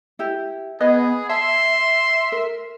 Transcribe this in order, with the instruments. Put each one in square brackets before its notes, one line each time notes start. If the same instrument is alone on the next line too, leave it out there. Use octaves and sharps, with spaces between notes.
[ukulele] E4 G4
[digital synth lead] B3 [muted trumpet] G#4 [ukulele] D#5
[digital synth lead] E5 [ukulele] A5 [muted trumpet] C6
[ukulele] A#4